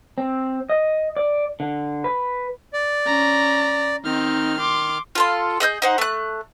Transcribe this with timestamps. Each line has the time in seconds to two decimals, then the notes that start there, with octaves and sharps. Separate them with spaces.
0.18 C4
0.70 D#5
1.17 D5
1.60 D3
2.04 B4
2.73 D5
3.06 C#4 A#5
4.04 D#3 C4 D#4 F6
4.60 C6 D6
5.15 F4 A4 C6
5.60 G#4 D#5 E6 G6
5.82 D#4 C5 F#5
5.98 A3 F#6